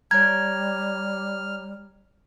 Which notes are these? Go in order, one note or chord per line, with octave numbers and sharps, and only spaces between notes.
G3 C#5 A#5 F6 G#6